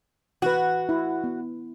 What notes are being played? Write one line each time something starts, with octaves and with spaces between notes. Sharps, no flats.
E3 F#4 B4
E4
B3